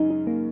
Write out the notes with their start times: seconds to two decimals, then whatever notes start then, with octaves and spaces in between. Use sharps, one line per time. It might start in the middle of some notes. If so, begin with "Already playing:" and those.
Already playing: F#2 C#3 G#3 C#4 D#4
0.10 D#4
0.27 A#3